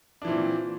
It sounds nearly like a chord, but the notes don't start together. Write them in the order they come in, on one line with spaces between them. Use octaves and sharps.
D4 E3 A#2 C4